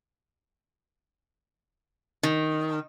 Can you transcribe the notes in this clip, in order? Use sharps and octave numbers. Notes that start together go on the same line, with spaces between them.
D#3